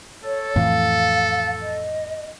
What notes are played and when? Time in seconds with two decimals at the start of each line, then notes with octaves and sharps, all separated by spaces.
0.24 A4 C#5
0.56 F2 A2 E3 F5
1.62 D#5